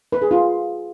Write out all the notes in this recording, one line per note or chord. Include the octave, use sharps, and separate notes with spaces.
B4
G#4
F4